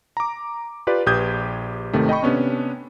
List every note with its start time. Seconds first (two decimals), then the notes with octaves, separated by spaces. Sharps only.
0.17 A#5 D6
0.87 F4 G4 B4 D5
1.06 A#1 G4 B4 D#6 G6 G#6
1.93 G#1 C3 D#3 A3
2.09 D#5 G5 B5 C#6
2.23 C3 B3 C#4 D4